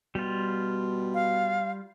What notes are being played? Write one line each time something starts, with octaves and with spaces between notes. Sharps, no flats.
B2 G3 F4
F5